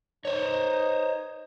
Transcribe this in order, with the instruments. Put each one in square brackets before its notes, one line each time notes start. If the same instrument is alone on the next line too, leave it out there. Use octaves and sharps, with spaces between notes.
[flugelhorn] D#4 [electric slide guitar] C5 C#5